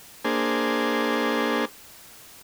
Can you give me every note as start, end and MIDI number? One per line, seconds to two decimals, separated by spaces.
0.25 1.65 58
0.25 1.65 62
0.25 1.65 68
0.25 1.65 72